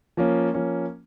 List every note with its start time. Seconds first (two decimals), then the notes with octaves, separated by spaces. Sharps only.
0.17 F3 A#3 C#4
0.54 F3 A#3 C#4